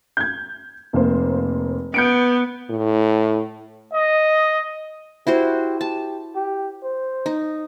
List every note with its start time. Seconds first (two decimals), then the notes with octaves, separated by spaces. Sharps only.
0.17 G6 G#6
0.93 F1 A#3 C5
1.94 B3 G6 C#7 D7
2.70 A2
3.94 D#5
5.27 E4 F#4 G4 C5
5.81 G4 A5
6.35 G4
6.83 C5
7.26 D#4